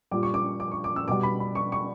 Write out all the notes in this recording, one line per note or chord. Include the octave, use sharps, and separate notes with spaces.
A#2 G3 D6
C#6
D6
D6
C#6
D6
E6
B2 G3 D6
B5
B5
C#6
C#6